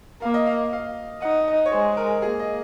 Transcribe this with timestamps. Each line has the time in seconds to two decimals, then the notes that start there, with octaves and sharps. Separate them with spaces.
0.22 A#3 F5
0.34 D#5
0.46 F5
0.73 F5
1.22 D#4 F#5
1.48 D#5
1.66 C#5
1.72 G#3 C5
1.97 A#4
2.22 A#3 G#4
2.40 D#5